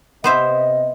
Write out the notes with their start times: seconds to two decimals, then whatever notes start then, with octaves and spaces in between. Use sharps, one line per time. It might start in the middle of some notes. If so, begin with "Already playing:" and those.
0.24 C3 B3 C5 D#5 E5